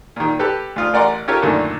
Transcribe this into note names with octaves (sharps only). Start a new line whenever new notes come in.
A#2 D#3
G4 A4 B4
D2 F4 D#6
A1 A#4 D5 F#5 A#5 C6
C#4 F4 G4 A4 A#4 C#5
F#2 A#2 D3 D#3 A3 A#3